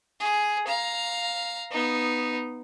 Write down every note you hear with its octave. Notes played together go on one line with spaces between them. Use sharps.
G#4
F5 A#5
B3 D#4